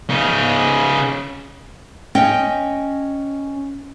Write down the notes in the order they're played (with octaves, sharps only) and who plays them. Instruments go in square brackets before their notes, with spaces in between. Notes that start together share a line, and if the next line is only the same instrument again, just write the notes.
[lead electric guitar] C#3 D#4
[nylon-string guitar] C#4 D#5 G5